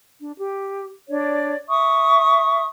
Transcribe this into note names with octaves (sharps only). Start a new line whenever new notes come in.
D4
G4
D4 C#5 D5
E5 C#6 D#6